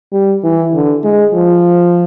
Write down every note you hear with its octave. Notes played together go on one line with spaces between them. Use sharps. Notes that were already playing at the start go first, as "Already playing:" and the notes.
G3
E3
D3
G#3
F3